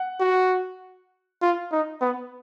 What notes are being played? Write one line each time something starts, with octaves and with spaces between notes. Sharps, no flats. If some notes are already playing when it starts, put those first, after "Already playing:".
Already playing: F#5
F#4
F4
D#4
B3